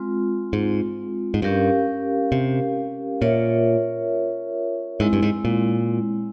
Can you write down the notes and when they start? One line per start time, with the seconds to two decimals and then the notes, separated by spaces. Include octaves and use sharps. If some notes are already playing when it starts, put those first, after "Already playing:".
Already playing: G#3 C4 F4
0.53 G#2
1.34 G#2
1.42 G2 C#4 G4 A#4 F5
2.32 C3
3.21 A#2 F4 A#4 C#5 E5
5.00 G#2 G#3 C4 E4
5.13 G2
5.22 G#2
5.45 A#2